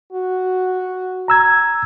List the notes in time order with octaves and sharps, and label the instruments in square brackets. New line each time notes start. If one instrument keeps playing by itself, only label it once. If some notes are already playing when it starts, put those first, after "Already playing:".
[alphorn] F#4
[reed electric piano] A#5 E6 G#6